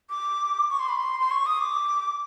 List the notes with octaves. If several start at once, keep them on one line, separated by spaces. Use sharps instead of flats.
D6
C#6
C6
B5
C6
C6
C#6
D#6
D6